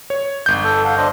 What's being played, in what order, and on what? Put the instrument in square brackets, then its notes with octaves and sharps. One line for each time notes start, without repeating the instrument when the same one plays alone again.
[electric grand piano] C#5
G1 G6
[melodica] A4
A4 F5 F#5
D4 C5 D#5